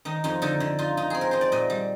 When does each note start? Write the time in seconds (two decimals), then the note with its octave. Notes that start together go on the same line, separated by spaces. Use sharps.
0.05 D#3 D#4
0.24 F2 D#4
0.42 D3 D#4
0.60 D3
0.79 D#4 F4
0.97 D#4
1.10 C4 G#4
1.21 A#4
1.31 D#4 C5
1.41 D5
1.52 A#2 D#5
1.70 G3